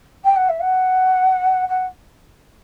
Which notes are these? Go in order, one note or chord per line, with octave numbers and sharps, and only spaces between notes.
G5
F#5
E5
F#5
F#5